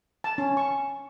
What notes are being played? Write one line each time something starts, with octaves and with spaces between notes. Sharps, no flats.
A5
C#4
C#6